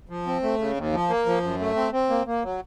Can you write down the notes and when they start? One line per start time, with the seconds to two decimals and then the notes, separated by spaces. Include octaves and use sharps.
0.09 F3
0.27 C4
0.43 A3
0.59 C#3
0.76 D#2
0.93 F3
1.09 A#3
1.26 F3
1.43 F#2
1.60 A3
1.76 C4
1.93 C4
2.10 A#3
2.27 A#3
2.44 F#3